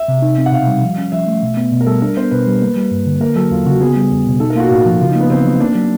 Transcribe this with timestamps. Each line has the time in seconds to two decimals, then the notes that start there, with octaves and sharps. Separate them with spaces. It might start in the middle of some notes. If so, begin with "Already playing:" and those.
Already playing: E5
0.08 C3
0.22 D#4
0.38 C4
0.46 F#5
0.52 B2 F5
0.67 G3
0.82 F3
0.98 C#4
1.12 F3 E5
1.27 A3
1.42 B2
1.57 B3
1.72 B2
1.81 A#4
1.87 G3 A4
2.02 D4 A#4
2.17 B3 C5
2.31 B2 B4
2.47 G3
2.62 A#3
2.76 G3
2.91 G2
3.06 D3
3.21 A#3 A#4
3.36 F#3 A4
3.51 E2 F4
3.66 C#3 F#4
3.81 B3 G#4
3.96 G3
4.11 E2
4.25 B2
4.40 D#4 A4
4.50 A#4
4.56 A#3 F4
4.60 F#4
4.70 A2 F4
4.86 F3 F#4
5.00 C#3 F4
5.10 D#4
5.15 A#3
5.21 B3
5.30 C#3 C4
5.45 F#3
5.60 A#3 D4
5.75 F#3